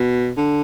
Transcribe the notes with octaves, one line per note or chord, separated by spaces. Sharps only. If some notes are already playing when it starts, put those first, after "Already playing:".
Already playing: B2
D3